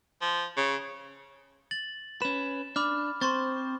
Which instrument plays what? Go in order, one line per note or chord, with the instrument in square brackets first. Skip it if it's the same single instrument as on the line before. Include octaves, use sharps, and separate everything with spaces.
[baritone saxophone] F3
C#3
[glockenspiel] A6 F#7
[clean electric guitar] C#4 B4 [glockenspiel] E7
[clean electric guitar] D4 [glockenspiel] B5 D6 F6
[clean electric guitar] C4 C5 [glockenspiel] C6 C#6 A6